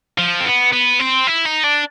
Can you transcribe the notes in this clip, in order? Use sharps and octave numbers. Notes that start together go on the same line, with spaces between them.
F3
C4
B3
B3
C4
E4
D#4
D4